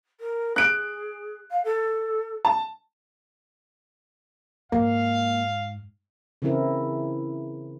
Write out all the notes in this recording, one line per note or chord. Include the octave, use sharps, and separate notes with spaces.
A#4
G#4 F#6 D7
F5
A4
A5
G#2 A#3 F5
C#3 E3 C4 E4 A#4